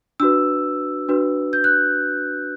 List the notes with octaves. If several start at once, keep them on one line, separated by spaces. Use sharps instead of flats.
D4 F#4 B4 E6
D4 F#4 B4
G6
F#6